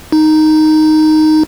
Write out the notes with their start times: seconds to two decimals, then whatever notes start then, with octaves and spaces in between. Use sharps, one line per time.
0.12 D#4